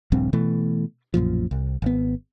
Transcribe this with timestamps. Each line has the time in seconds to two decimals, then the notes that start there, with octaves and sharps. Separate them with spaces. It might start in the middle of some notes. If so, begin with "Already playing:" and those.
0.12 D#1 A#1 G2 C4
0.33 B2 E3 A3
1.14 B1 F#2 A#2 F3
1.51 C2
1.82 G#1 B3